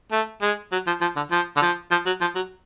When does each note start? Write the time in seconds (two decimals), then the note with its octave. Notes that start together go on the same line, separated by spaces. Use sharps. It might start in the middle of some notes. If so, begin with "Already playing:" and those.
0.12 A3
0.42 G#3
0.72 F#3
0.87 F3
1.01 F3
1.16 D3
1.31 F3
1.56 D3
1.62 F3
1.91 F3
2.06 F#3
2.21 F3
2.35 F#3